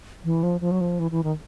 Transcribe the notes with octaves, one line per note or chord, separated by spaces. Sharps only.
E3
F3
F3
F#3
F3
E3
E3
D#3